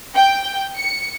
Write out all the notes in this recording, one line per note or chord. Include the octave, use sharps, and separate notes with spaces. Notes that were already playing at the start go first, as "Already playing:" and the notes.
G5
C#7